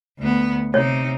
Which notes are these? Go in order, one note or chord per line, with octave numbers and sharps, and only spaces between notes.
D2 B3
C3 D#4 C#5